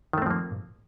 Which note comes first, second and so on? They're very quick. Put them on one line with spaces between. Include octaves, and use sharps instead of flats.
D#3 A3 C4 F3 A#3